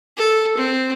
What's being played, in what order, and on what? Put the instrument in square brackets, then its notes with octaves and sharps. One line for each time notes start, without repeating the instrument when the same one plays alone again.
[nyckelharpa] A4
C4